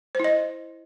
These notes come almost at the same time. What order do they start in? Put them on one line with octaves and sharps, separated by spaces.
C5 E4 D#5